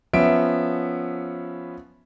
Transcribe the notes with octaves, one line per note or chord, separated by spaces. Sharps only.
F3 B3 C#4 E5 D7